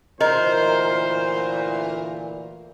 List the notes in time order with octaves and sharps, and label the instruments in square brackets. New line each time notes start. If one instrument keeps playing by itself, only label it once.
[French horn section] D2 A#2 E3 [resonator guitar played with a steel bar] A#4 [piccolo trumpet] C5 [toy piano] D#5